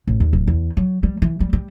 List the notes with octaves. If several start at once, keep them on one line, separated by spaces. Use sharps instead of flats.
A1
D#2
D1
E2
F#3
G3
E3
G3
G3